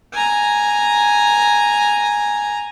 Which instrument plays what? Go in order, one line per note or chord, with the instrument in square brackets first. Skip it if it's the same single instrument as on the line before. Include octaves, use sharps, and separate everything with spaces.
[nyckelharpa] G#5 A#5